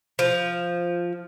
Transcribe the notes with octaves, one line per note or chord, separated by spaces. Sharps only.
F3